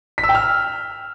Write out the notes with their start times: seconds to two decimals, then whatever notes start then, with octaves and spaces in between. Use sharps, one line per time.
0.18 B6
0.23 E6
0.29 G5
0.35 F6